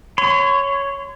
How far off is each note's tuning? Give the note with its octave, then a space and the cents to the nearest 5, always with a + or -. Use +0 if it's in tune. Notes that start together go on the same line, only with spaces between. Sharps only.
C#5 +0 C6 -40